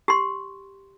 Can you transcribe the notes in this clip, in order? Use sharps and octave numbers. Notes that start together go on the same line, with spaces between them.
G4 C6